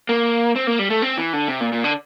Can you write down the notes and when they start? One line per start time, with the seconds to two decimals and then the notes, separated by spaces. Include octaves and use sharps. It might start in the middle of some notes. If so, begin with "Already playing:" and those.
0.09 A#3
0.56 C4
0.67 A#3
0.79 G3
0.90 A3
1.02 C4
1.18 E3
1.33 D3
1.48 C3
1.60 A#2
1.73 A#2
1.84 D3